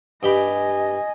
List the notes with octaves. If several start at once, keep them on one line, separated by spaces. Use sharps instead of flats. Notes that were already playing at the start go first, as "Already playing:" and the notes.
G2 G4 D#5 G#5 B5